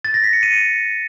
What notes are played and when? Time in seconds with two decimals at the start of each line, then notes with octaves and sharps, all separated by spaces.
0.05 A6
0.14 A#6
0.24 B6
0.33 C#7
0.43 D#7